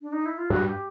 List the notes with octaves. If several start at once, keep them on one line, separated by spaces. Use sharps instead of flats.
D4
D#4
E4
F4
G2 F#4
G4